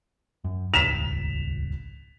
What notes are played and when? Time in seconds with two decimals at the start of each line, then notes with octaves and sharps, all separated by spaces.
0.44 F#2
0.74 D#1 G#1 C#2 B6 E7 F7